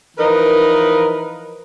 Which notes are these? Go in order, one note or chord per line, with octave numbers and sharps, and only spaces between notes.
E3 F3 D#4 A#4 B4